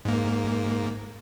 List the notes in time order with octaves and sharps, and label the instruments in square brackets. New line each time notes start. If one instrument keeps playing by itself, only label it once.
[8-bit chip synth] G#2 A#3